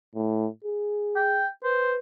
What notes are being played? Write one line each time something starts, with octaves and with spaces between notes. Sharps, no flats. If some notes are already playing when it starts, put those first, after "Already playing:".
A2
G#4
G5
B4 C5